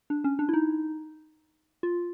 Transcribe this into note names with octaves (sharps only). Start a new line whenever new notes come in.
D4
C#4
D4
E4
D#4
F4